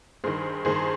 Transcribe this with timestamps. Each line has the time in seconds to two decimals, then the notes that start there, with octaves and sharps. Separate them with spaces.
0.24 G2 D#3 G#4 C5
0.65 G2 D#3 G#4 C5